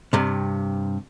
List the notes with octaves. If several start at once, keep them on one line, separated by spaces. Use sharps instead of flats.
G2 C3